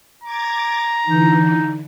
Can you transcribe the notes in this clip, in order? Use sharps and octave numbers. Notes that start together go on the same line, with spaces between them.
A#5 D6 G#6 A6
D3 E3 D#4